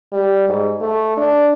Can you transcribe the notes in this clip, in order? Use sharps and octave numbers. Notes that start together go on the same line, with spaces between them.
G3
G#2
A3
D4